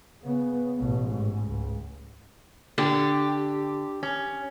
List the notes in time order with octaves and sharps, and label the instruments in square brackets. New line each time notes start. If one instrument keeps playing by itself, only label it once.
[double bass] C#3 B3
A1 B2
G#2
C#2
[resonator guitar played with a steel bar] D3 [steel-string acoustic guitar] G4
[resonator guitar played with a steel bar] C#4